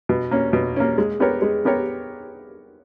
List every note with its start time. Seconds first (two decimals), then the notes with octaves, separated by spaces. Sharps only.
0.09 B2
0.31 A#3 C#4
0.53 B2
0.76 A#3 C#4
0.98 G#3
1.20 B3 G4 A#4 C#5
1.42 G#3
1.65 B3 G4 A#4 C#5